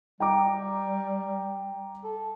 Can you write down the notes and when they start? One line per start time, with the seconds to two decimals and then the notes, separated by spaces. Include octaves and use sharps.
0.20 G3 G5 A#5 D6
2.04 A4